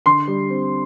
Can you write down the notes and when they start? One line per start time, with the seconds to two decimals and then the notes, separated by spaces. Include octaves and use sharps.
0.06 D3 C6
0.27 G3
0.50 C4